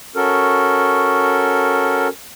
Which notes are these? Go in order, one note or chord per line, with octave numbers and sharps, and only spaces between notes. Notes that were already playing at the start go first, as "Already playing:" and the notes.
C#4 F#4 A4 A#4